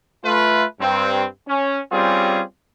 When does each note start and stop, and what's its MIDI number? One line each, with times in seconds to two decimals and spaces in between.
0.24 0.64 57
0.24 0.64 65
0.24 0.64 71
0.80 1.25 43
0.80 1.25 60
1.47 1.79 61
1.91 2.41 55
1.91 2.41 60
1.91 2.41 61
1.91 2.41 65
1.91 2.41 67
1.91 2.41 68